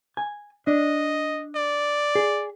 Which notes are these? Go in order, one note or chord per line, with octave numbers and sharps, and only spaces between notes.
G#5
D4 D#5
D5
G#4